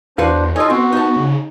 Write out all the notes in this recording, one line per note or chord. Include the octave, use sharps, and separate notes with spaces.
E2 D4 F#4 B4 C5 F5
D#4 F4 A4 C#5 D#5 G#5
B3 C4 F#4
D#4 A5
C#3